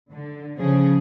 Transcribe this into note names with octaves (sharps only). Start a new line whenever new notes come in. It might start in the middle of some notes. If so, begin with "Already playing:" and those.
D3
C#3 F3 G#4